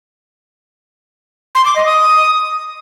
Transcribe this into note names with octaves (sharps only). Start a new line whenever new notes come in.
C6
D6
D#5
D#6